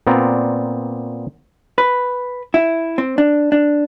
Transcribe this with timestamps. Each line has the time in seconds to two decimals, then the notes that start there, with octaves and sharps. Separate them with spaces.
0.07 A#2 B3 C4 D5 A#5
1.78 B4
2.54 E4
2.98 C4
3.18 D4
3.52 D4